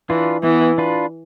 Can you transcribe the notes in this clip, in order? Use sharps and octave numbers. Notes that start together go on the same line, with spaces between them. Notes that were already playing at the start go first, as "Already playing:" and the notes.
E3 D4 F4 B4
E3 B3
D4 F4 B4